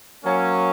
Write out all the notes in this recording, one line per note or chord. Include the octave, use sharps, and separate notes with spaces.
F#3 A#3 C#4